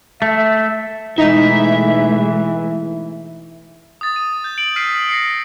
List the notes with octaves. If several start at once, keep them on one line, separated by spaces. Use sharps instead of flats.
A3 E5
B2 E3 G#3 A3 D#4 E5
D#6 A6
D#7
G6 A6
D7 F#7
E6 F6 B6 C7 D#7
A#6 C7 C#7